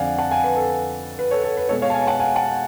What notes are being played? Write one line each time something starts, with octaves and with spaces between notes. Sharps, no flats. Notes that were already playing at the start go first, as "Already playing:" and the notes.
Already playing: F2 D3 F3 D5 F5 F#5 G#5
F#5 A5
F5 G#5
B4
A4
B4
A4 C#5
A4
B4
B2 G#3 B3 A4 C#5
C#5 F5
A5
F5 G#5
F#5 A5
F5 G#5
F#5 A5